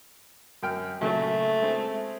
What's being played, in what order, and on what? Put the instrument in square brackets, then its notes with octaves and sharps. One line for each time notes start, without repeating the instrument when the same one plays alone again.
[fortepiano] F#2 G5 F6
[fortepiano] A#2 C#3 F#3 [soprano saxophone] A3
[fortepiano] G#3 C4